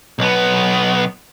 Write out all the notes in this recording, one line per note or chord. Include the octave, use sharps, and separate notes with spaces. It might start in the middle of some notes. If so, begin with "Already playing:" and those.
B1 B3